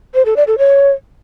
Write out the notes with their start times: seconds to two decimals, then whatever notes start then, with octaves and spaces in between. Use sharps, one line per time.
0.14 C5
0.25 A4
0.36 D5
0.47 A4
0.58 C#5